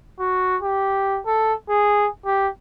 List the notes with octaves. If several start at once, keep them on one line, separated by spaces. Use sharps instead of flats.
F#4
G4
A4
G#4
G4